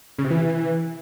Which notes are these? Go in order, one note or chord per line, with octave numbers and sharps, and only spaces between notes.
C#3
C3
E3